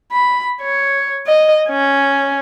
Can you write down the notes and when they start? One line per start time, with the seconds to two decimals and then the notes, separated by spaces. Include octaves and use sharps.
0.12 B5
0.62 C#5
1.27 D#5
1.69 C#4